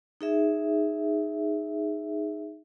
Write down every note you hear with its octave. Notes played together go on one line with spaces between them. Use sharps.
D#4 G#4 E5